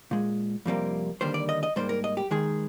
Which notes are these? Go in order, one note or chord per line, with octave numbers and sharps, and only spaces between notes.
A#2 G#3
F2 C3 G3 A#3
D#2 D3 G3 A#3 C5
D5
D#5
D#5
G#2 G3 A#3 C5
A#4
D#5
G4
D#2 D#3 G#3 G#4